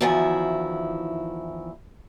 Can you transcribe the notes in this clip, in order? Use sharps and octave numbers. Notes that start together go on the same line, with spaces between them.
E2 D#3 F3 E4 F#4 G#5